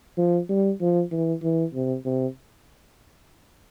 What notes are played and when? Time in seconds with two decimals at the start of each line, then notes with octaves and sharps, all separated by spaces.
0.17 F3
0.49 G3
0.81 F3
1.12 E3
1.43 E3
1.74 C3
2.05 C3